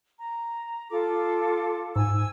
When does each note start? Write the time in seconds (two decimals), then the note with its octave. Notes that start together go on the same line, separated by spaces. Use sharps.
0.20 A#5
0.90 F4 A4 D6
1.96 G#2 G#5 E6